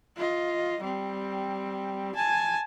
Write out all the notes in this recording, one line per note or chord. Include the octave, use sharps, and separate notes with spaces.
F4 D#5
G3 C4
G#5 A5